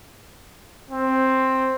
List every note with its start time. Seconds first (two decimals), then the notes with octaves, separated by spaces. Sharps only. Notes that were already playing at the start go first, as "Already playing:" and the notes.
0.91 C4